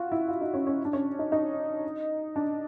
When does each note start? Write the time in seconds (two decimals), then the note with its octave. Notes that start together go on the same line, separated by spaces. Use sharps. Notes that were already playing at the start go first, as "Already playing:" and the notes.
Already playing: F4 F#4
0.12 E4
0.28 F4
0.41 D#4
0.54 C#4
0.67 C#4
0.85 D4
0.93 C#4
1.19 D#4
1.32 D#4
2.36 D4